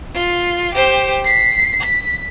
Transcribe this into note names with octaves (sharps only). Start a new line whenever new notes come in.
F4
G4 C5
B6 C7
B6